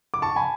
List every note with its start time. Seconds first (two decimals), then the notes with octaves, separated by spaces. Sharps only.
0.14 D6
0.22 A5 C#6
0.36 G#5 B5